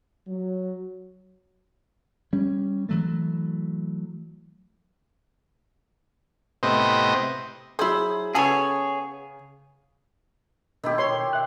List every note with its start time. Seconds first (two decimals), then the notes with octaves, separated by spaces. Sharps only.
0.28 F#3
2.33 G3 C#4
2.89 E3 F#3 A3
6.63 A2 C3 B3 C5 D#5
7.79 F#3 E4 G#4 C5
8.35 C#3 B3 G#4 A4 C#5 G#5
10.84 B2 D#3 E4 G4
10.98 C#5 C6
11.33 E5 F#6